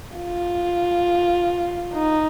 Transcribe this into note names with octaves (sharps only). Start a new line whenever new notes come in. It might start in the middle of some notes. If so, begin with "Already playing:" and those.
F4
D#4